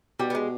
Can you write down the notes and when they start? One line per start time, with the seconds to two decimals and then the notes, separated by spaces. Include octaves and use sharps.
0.19 B2 G3
0.30 B3
0.35 G#3